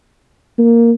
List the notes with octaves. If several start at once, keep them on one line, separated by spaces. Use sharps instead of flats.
A#3